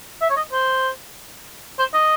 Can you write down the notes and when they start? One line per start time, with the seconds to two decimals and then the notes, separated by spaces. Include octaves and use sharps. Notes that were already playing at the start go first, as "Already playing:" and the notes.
0.21 E5
0.30 C#5
0.37 D#5
0.52 C5
1.79 C5
1.93 D#5